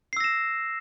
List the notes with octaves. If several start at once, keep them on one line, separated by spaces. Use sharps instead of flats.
E6 A#6 C7 E7